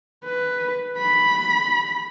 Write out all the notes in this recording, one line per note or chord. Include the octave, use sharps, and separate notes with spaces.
B4
B5